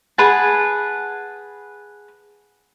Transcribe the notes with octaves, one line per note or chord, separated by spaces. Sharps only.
G#4 B4 F#5 A5